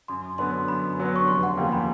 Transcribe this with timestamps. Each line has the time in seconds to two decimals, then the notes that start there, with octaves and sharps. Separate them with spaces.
0.08 F#2 C6
0.38 D3 F#3 B3 C6
0.68 F#2 B5
0.98 D3 F#3 B3
1.16 C#6
1.28 F1 C6
1.43 F#5
1.57 D#2 C#3 F3 A#3 G5
1.72 B5